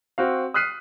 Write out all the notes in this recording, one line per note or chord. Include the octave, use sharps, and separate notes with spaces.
C4 F#4 F5
D#6 F6 F#6 B6 C7 D#7